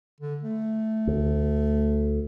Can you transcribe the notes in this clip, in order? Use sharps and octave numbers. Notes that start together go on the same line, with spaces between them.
D3
A3
D2